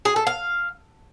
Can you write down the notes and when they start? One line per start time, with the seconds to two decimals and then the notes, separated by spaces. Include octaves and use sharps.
0.05 G#4
0.16 A4
0.27 F5